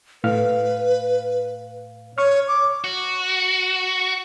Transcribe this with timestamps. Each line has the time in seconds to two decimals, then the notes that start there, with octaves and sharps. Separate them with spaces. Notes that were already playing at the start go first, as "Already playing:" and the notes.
0.24 A2 B4 F5 F6
2.18 C#5 C#6 F6
2.48 D6
2.84 F#4